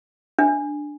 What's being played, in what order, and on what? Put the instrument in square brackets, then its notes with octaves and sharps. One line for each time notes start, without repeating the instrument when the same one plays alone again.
[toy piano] D4